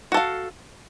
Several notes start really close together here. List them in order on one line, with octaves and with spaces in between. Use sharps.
F#4 A4 F5